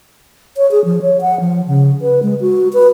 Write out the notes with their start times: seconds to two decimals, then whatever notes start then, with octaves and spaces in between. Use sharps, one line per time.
0.57 C#5
0.71 G#4
0.85 F3
1.02 C#5
1.21 F#5
1.40 F3
1.68 C#3
2.02 B4
2.23 G#3
2.41 F#4
2.73 B4